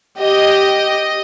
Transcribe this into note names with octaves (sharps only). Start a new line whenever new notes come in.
G4 D#5